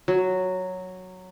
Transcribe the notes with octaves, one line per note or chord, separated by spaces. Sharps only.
F#3